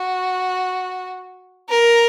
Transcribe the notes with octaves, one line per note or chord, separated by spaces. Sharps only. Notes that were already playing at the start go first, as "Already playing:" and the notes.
Already playing: F#4
A#4